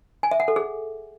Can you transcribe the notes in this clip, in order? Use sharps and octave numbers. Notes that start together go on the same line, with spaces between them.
G#5
E5
F#5
A4
G#4